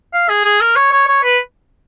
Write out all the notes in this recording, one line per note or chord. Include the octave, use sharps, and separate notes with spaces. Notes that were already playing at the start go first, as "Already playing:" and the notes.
F5
G#4
G#4
A#4
C#5
C#5
C#5
B4